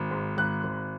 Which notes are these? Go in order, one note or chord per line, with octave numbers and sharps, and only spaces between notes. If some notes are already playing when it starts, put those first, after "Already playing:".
Already playing: G#1
G#2
G#1 F#6
G#1